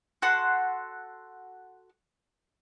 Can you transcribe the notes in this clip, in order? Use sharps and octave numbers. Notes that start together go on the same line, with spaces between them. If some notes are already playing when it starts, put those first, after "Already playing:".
F#4 A4 F#5 C6